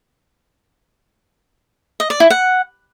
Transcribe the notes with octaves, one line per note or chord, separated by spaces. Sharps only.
D#5
D5
E4
F#5